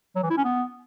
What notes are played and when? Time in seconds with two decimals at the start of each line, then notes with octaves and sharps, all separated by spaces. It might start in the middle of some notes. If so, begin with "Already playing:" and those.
0.16 F#3
0.23 E3
0.30 E4
0.37 C#4
0.44 B3